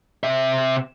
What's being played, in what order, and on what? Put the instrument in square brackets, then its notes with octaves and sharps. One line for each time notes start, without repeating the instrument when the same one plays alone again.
[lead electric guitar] C3 E5